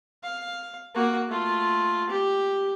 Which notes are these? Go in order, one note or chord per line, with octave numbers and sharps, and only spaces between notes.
F5
A#3 F#4
A3 F4
G4